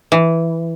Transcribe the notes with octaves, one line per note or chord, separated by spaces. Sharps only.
E3